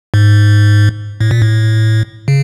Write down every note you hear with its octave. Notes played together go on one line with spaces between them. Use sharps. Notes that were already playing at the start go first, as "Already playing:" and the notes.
G#2
A2
A#2
A2
C#3